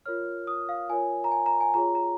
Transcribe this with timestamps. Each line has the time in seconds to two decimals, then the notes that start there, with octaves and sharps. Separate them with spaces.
0.06 F4 A#4 C#5 F6
0.47 D#6
0.69 F5
0.89 F4 A#4 C#5 G#5
1.24 A#5
1.32 G#5
1.46 A#5
1.61 G#5
1.74 F4 G#4 C#5 A#5
1.95 A#5